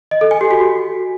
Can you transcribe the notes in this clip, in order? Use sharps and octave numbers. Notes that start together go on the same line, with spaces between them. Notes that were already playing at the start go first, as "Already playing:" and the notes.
D#5
A4
G#5
G4
F#4